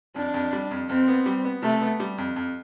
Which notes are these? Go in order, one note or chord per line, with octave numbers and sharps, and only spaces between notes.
F2 D4
F2
G3
F2
F2 C4
B3
G3
B3
C3 A3
B3
G3
F2
F2